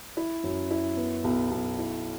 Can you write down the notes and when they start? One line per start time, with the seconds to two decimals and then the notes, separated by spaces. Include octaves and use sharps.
0.17 E4
0.43 F#2
0.71 E4
0.97 B3
1.24 B1
1.51 B1
1.78 E4